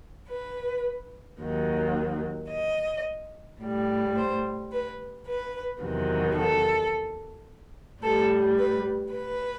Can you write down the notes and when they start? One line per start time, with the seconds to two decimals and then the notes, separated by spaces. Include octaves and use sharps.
0.30 B4
1.41 D#2 D#3 F#3
2.50 D#5
3.61 A2 G3
4.16 C5
4.72 B4
5.27 B4
5.82 E2 C3 D#3 F#3
6.37 A4
8.02 A2 G3 A4
8.58 B4
9.14 B4